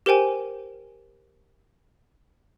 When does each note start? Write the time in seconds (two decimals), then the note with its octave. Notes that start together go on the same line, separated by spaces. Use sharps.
0.06 G4 A#4 C5 G5 G#5